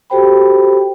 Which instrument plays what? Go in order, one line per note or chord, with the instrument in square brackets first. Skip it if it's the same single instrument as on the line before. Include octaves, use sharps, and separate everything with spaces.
[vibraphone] F#4 G4 A4 C5 G5 B5